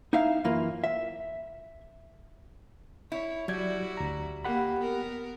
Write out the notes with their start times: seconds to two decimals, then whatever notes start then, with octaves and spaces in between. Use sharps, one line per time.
0.13 D#4 E4 E5 F5
0.44 F#2 E3 A#3 F4
0.84 E5
3.12 E4 C#5
3.48 F#3 G3 E4 F#4 G#6
3.97 D2 A#5
4.45 A#3 G4 F#5 B5
4.80 B3 A#4